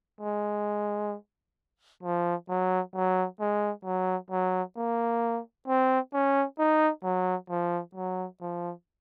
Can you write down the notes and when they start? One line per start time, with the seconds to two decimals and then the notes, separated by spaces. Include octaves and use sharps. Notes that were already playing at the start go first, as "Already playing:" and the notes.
0.21 G#3
2.03 F3
2.49 F#3
2.95 F#3
3.40 G#3
3.85 F#3
4.30 F#3
4.77 A#3
5.68 C4
6.13 C#4
6.59 D#4
7.04 F#3
7.49 F3
7.95 F#3
8.41 F3